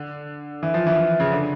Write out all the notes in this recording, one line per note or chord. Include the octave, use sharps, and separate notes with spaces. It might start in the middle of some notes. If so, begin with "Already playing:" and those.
Already playing: D3
E3
F3
E3
E3
C#3
D3